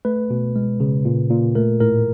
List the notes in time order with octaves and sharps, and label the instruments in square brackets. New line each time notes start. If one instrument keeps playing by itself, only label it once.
[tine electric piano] A3 B4
B2
G#3
C#3
A#2
A#2
A3 A#4
A2 A#4